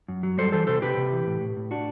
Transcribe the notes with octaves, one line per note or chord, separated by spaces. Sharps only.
F#2
F#3
G3 A4 C5
E3 A4 C5
C3 A4 C5
C3 G4 B4
C3
E3
A2
A2
A2
D4 F#4